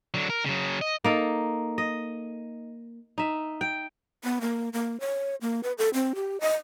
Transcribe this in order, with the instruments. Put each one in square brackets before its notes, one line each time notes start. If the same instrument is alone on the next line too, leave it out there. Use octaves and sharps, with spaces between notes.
[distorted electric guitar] D3 F#3
A#4
C#3 F#3
D#5
[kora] A#3 D#4 A4
D#5
D#4 E5
G5
[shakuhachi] B3
A#3
A#3
C#5
A#3
B4
A4
C4
G4
D#5